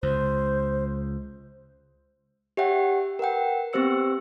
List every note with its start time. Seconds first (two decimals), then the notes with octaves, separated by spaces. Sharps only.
0.03 C#2 C5
2.57 G4 C#5 E5 F#5 G5
3.19 A#4 B4 F#5 G5
3.73 B3 C4 G4 C5 E6 C#7